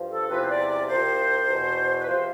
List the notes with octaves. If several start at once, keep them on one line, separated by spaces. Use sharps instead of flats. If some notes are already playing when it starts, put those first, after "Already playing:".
Already playing: G2 F3
A4
E2 C3 F3 B4
C5
D5
D5
C2 C3 F3 C5
E2 B2
B4
C3 F3 C5